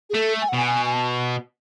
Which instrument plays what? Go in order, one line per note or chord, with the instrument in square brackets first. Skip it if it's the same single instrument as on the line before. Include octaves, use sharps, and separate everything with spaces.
[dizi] G#4
[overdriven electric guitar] A3 [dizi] A4
[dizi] G#5
F#5
[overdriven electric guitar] B2 [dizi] G#5
[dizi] G#5
G#5
A5